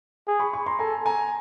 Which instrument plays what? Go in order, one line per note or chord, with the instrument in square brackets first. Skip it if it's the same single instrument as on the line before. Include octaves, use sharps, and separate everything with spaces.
[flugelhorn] G#4
[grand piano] B5 C#6
B5 C#6
A#5 C6
[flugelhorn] A4 [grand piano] G#5 A#5
[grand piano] G#5 A#5